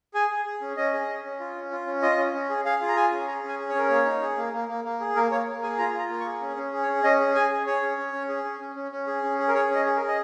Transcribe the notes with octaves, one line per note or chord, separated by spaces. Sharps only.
G#4 G#5
G#4
G#4
C#4
C#4 D#5
G#4
C#4
C#4
F4
C#4
F4
C#4
F4 D#5
C#4
C#4
G#4
G#4 F5
F4
A#5
G#4 G#5
C#4
G#4 A#5
C#4
G#5
G#4
C#5
C#4 A#4
A#3 C#5
D#4
G#4
A#3
A#3
A#3
A#3
G#4
A#3 A#4
A#3 C#5
A#3
G#4 G#5
F4 A#5
F4 A#5
A#3
C#6
G#4
C#4
C#4
G#4
C#5
C#4
C#4 D#5
G#4
G#4 G#5
G#4
G#4 C#5
C#4
C#4
C#4
G#4
C#4
C#4
C#4
C#4
G#4
C#4
G#4
A#4
G#4 C#5
C#4
D#5
G#4
A#4
G#4
D#5